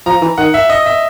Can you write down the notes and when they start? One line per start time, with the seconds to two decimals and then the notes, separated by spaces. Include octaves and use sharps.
0.06 F3 A#5
0.22 E3
0.38 D#3 F#5
0.54 E5
0.70 D#5
0.86 E5